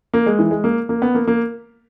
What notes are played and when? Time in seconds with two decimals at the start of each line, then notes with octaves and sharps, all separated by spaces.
0.14 A#3
0.26 G#3
0.39 E3
0.51 G#3
0.64 A#3
0.89 A#3
1.02 B3
1.15 A#3
1.27 A#3